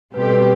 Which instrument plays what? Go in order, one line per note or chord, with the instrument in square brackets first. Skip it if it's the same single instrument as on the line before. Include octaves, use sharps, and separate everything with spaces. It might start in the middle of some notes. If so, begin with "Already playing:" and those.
[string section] B2 G3 C4 G4 [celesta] B4
[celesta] A4
B4